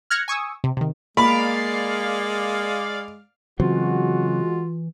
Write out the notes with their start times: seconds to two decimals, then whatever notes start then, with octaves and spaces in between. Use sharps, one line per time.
0.10 F6 F#6 G#6 A#6 C#7
0.28 G#5 C#6 D#6 E6
0.64 C3
0.77 C3 D#3
1.17 G#3 A#3 D5 F5 B5
3.60 C#3 E3 F#3 G#3 C4 F4 F#4